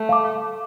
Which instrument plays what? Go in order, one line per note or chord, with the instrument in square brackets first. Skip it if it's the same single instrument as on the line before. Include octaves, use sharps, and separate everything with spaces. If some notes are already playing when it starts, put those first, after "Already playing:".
Already playing: [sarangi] A3
[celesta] F5 A5 D6